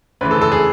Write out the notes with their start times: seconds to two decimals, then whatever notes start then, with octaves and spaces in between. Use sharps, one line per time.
0.21 D2 C#3 E3 B4
0.31 A4
0.41 A4
0.52 G#4